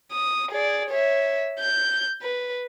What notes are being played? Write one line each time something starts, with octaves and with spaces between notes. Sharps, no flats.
D#6
G#4 D5
C#5 E5
G6
B4